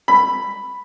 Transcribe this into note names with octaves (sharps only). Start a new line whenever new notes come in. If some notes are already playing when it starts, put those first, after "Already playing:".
B5